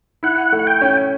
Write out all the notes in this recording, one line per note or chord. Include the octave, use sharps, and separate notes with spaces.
E4 F#5
A3
F#5
G5
C#4